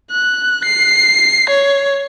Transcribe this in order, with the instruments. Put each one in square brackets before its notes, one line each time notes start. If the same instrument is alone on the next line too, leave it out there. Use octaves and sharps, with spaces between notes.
[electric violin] F#6
C7
C#5